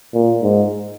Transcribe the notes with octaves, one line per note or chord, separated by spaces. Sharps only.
A#2
G#2